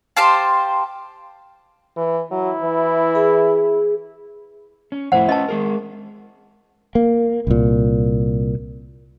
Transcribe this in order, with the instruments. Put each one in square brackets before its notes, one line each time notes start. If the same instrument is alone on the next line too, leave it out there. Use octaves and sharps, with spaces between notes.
[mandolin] G4 C5 F5 A5
[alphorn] E3
[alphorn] F#3 [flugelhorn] E4
[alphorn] E3
[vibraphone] G#4
[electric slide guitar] C#4
[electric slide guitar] F2 A2 E4 [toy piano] C5 F#5
[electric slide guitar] C#4 B4 C#5 [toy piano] D#5 A5
[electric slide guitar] G#3 G#4 A#4
[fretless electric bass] A#3
C2 A#2